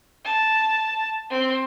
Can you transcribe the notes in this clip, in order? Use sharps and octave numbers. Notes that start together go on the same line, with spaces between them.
A5
C4